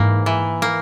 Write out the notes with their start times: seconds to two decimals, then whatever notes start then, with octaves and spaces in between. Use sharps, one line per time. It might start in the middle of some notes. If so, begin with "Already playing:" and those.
Already playing: G#2 E3 A#3
0.26 E3
0.62 A#3